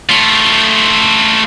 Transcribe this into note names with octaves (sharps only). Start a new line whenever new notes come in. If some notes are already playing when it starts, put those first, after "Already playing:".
A3 F4